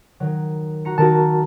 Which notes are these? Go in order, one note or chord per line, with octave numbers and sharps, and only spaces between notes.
D#3 F#3
F#4 A#5 C#7
D#3 D#4 F#4 A#4 A5